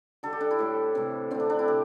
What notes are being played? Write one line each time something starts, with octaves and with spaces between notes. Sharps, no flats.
D3 G3 A4
G4
D4
E4
A2 G3
C3 E3 A3
D3 A3 C4
D4
D4
E4
C3 G4